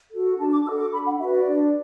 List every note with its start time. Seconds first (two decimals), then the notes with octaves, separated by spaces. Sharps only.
0.11 F#4 A4
0.38 D4 A5
0.52 D6
0.65 F#4 E6
0.69 A4
0.78 D6
0.92 D4 B5
1.06 F#5
1.19 F#4 E5
1.23 B4
1.33 D5
1.46 D4